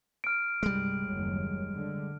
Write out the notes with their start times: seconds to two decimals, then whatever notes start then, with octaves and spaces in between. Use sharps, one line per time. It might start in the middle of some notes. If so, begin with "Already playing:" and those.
0.24 F6 D7
0.63 C2 G2 G3 G#3
1.04 F#1 D#2 F#3
1.75 D3